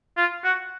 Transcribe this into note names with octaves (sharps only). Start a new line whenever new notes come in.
F4
F#4